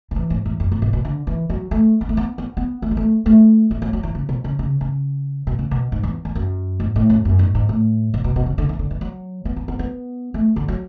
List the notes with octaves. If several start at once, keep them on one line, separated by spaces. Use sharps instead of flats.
D3
E3
G#2
E2
F#2
G#2
B2
B2
D3
E3
F#3
A3
B3
A3
B3
B3
B3
A3
G#3
A3
A3
A3
F#3
F#3
E3
C#3
B2
C#3
C#3
C#3
B2
C#3
B2
G#2
E2
E2
F#2
G#2
A2
F#2
F#2
G#2
G#2
A2
B2
B2
B2
C#3
D3
E3
D3
E3
F#3
B3
B3
B3
B3
A3
D3
F#3